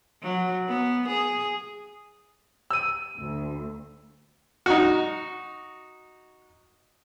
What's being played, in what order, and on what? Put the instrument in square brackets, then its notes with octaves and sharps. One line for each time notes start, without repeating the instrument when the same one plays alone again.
[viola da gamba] F#3
B3
G#4
[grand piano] E6 D#7
[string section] D2
[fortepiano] D#4 F#4